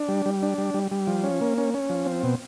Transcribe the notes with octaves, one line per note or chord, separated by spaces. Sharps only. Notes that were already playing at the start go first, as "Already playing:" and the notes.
Already playing: D4
G3
G3
D4
G3
G3
G3
F3
C#4
A#3
C#4
C#4
F3
C4
B2